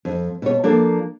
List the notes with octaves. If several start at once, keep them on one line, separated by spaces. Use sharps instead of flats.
F2
B2 C#5
F3 A#3 D4 A4